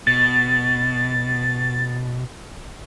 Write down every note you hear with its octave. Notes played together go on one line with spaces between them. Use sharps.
B2 A6